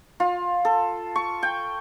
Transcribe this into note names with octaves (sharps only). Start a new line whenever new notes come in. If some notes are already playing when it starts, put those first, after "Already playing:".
F4
A4
C#6
G5